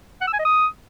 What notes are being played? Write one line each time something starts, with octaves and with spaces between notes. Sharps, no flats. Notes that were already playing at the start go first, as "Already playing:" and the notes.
F#5
E6
G#5
D#5
D#6